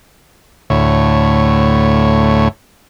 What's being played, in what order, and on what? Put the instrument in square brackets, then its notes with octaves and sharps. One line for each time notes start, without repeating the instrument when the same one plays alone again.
[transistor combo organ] D2 A2 C#5